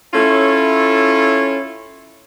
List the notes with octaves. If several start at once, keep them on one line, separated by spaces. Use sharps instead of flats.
C#4 E4 F4 A4 C#5